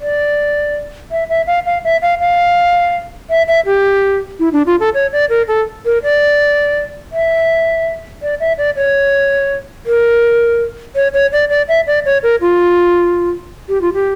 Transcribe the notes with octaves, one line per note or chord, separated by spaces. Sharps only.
D5
E5
E5
F5
F5
E5
F5
F5
E5
E5
G4
E4
D4
F4
A4
C#5
D5
A#4
A4
A#4
D5
E5
D5
E5
D5
C#5
A#4
C#5
C#5
D5
D5
E5
D5
C#5
A#4
F4
G4
F4
G4